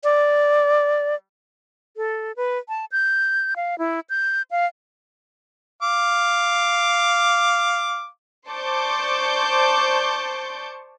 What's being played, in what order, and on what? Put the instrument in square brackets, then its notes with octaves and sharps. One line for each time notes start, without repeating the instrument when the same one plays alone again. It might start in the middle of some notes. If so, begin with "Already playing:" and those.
[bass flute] D5
[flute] A4
B4
A5
G6
F5
E4
G6
F5
[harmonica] F5 D6
[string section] C5 D5 A5 C#6 D6 G6